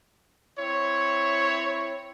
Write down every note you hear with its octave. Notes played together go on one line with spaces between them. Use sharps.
C4 E4 C#5